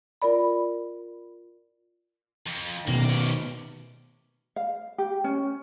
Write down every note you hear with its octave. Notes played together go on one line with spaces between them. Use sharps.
F4 A#4 D5 B5
F2
B2 D#3 A#3
C#4 D5
F5
G4
C#4